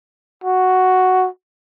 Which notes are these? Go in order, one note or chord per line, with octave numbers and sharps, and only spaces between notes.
F#4